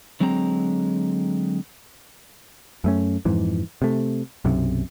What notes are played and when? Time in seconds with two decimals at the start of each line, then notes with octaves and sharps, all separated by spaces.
0.20 D3 F#3 G#3 C4 A5 A#5
2.84 F#2 A3 C#4
3.25 F2 G#2 E3
3.82 C3 A3
4.45 B1 F#2 C3